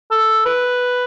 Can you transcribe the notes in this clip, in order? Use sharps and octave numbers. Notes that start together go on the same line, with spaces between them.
A4
B4